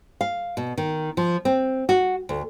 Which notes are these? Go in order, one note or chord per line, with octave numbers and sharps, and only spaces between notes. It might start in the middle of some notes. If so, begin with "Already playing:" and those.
F5
B2
D#3
F3
C4
F#4
D2